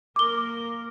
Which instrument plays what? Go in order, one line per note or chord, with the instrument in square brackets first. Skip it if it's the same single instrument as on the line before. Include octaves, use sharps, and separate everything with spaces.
[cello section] A#3 A#4 [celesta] D6 G7